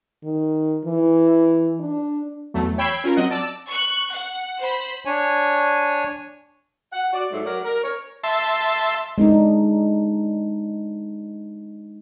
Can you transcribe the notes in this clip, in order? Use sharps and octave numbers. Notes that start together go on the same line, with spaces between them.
D#3
E3
D4
E2 F#3 A3
C#5 G5 B5 E6 G#6 C7
C#4 F4 A#4
F#3 C4 D#5 F#5
D5 A5 E6
C#6 F#6
F#5
C5 B5
D4 C#5 G#5
F#5
F#4 D5
G#2 F#3 A3
F#3 A#4 C#5 D5
A#4
C#5
E5 A5 C6
G#3 D4 D#4